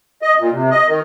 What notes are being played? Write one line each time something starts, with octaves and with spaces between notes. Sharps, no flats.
D#5
A#2
C3
D#5
D#3